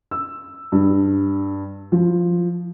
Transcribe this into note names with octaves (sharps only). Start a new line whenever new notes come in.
E6
G2
F3